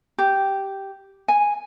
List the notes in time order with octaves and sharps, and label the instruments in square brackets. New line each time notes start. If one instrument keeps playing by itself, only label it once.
[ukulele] G4
G#5